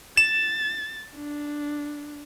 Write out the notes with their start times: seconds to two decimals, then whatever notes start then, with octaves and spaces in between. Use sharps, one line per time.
0.17 A6 E7
1.15 D4